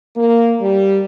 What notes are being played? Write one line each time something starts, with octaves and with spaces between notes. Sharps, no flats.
A#3
G3